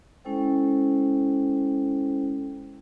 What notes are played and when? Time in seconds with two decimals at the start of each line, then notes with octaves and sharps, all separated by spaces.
0.25 G#3 C#4 E4 A4 C5 G5